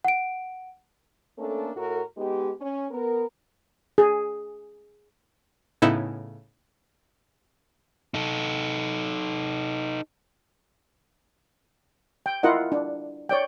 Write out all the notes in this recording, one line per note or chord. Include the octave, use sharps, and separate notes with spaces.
F#5 D7
A3 A#3 C#4 D4 A4
A2 F#4 A4 A#4
G#3 B3 D#4 G4
C#4
B3 A#4
G#4
A2 C#3 B3 D#4 E4
D#4 A4
G5
E4 F4 A#4 D#5 F#5
D4
C#5 D5 G5